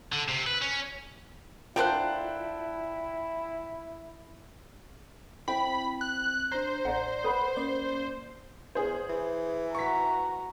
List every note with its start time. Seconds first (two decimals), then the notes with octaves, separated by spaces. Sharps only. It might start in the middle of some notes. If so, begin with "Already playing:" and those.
0.12 D3
0.28 C3
0.47 B4
0.62 C#4
1.76 D3 E4 F4 A#4 C5 G5 A5 F#6
5.48 C4 E4 G5 B5
6.01 F#6
6.52 D4 C5 A#5
6.85 A1 D5 F#5 A#5
7.24 B4 C#5 F#5 B5 D#6
7.56 A#3 C#4 D5
8.75 E2 G#4 C5
9.09 E3
9.75 F#4 A#5 C#6 B6